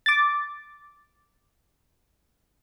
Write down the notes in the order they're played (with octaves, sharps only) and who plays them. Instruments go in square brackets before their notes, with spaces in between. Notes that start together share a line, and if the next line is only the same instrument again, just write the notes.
[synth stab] D6 A6